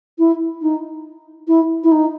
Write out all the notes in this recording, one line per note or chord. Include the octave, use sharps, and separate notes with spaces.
E4
D#4
E4
E4
D#4